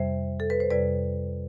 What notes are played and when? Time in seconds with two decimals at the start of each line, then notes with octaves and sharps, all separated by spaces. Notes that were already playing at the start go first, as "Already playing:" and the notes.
Already playing: F2 C3 G3 C5 E5
0.40 A4
0.50 B4
0.60 C5
0.70 F2 C3 G3 B4 D5